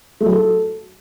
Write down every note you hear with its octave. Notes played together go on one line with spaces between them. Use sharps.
A3
F#3
A4